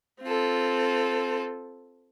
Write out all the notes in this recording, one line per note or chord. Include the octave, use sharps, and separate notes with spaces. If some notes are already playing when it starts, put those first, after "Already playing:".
C4 F4 A4